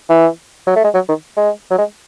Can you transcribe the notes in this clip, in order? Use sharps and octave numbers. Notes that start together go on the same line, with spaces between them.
E3
F#3
A3
G#3
F#3
D#3
G#3
F#3
G#3